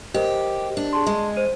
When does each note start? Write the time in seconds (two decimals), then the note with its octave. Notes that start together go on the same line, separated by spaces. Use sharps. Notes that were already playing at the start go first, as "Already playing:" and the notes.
0.14 G4 A#4 C5 D#5
0.77 D4
0.93 G#4 A5 C6
1.07 G#3
1.37 C5 D#7